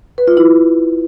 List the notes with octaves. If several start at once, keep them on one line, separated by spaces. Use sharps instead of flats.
B4
F4
E4